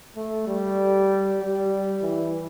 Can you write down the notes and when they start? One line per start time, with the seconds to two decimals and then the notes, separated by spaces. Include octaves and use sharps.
0.16 A3
0.47 G3
1.40 G3
2.02 E3